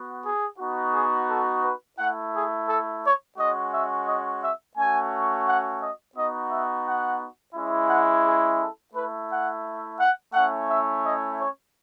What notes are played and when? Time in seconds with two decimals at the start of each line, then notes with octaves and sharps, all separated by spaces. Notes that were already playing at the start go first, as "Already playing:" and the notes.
Already playing: B3 F#4
0.25 G#4
0.59 B3 D#4 F#4
0.94 G#4
1.29 A4
1.64 B4
1.98 A3 E4 F#5
2.33 G#4
2.68 A4
3.03 C#5
3.38 G#3 C#4 F#4 D#5
3.73 E5
4.07 D#5
4.42 E5
4.77 A3 C#4 F#4 G#5
5.46 F#5
5.81 D#5
6.16 B3 D#4 F#4 D#5
6.51 E5
6.86 F#5
7.55 G#3 C#4 E4
7.90 F#5
8.25 G#4
8.60 A4
8.94 A3 E4 B4
9.29 F#5
9.99 F#5
10.33 A3 C#4 E4 F#5
10.68 E5
11.03 D#5
11.38 C#5